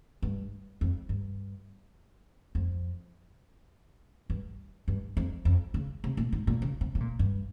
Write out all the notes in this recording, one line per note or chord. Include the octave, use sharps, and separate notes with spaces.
G2
F2
G2
F2
G2
G2
F2
F2
C#3
C3
A#2
G#2
A#2
C#3
C3
C3
A#2
G2